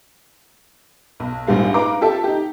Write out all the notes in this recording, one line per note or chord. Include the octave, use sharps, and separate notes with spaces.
B1
A#1 G#2 G3 F5
D#4 B4 F5 A#5 D6
F4 G4 A4 E5 A5
D#4 G4